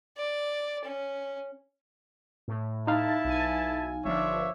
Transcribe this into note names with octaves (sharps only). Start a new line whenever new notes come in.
D5
C#4
A2
D#4 E4 F5 A5
B1 G#5
G1 F3 D4 C#5 E5